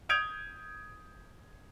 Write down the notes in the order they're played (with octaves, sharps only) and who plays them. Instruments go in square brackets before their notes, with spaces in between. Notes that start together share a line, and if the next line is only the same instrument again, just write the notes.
[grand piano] D#6 G6 G#6 D7 F7